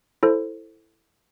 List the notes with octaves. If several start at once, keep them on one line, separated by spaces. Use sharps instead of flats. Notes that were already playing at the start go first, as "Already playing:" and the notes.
E4 A4 C5